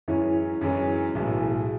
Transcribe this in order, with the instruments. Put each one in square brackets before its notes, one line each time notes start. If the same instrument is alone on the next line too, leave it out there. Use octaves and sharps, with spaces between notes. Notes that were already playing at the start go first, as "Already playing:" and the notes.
[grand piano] F#2 E3 G#3 C#4 [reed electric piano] E4
[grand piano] F#2 E3 G#3 C#4
[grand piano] B1 A2 E3 G#3 [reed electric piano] F#4
[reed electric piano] G#4